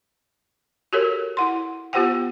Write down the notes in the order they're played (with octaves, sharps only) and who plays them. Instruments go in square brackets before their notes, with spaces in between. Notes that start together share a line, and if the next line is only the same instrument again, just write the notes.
[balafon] F#4 G4 A4 A#4 C#5
E4 F#5 C6
B3 F4 G4 C5 F#5 G5